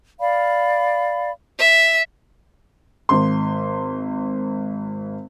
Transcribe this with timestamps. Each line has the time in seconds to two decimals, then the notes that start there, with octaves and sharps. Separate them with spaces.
0.20 D5 F5 B5
1.59 E5
3.09 G#1 C6